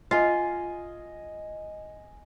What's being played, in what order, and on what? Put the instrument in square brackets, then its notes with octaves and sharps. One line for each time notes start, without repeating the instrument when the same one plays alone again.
[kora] F4 [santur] D#5 G#5